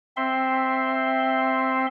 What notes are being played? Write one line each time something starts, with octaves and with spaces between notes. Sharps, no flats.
C4 E5 C6